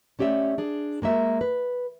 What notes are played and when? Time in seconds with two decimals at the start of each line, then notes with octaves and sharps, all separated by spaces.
0.19 A3 C#4 G4 D5 E5
0.58 D4 G#4
1.02 G#3 A#3 F#4 E5
1.41 B4